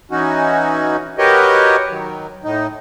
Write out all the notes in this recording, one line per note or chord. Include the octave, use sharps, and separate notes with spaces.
E3 C#4 D#4 F#4
F#4 G4 A#4 B4 C#5 D#5
D#3 F#3
A2 D#4